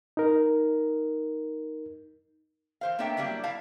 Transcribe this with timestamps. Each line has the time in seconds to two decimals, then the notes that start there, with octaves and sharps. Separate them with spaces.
0.17 D#4 A#4
2.81 E3 C5 F5
2.99 A#3 B3 D4 C#5 E5 G5
3.17 F#3 G3 A#3 D4 E4
3.44 E4 F5 A5